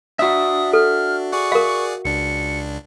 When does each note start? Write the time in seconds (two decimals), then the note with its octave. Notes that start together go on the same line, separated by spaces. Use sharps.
0.19 D4 F#4 E5 D#6
0.73 A4 F6
1.32 G#4 D5 F#5 C#6
1.52 A#4 F5
2.05 C#2 D4 C#7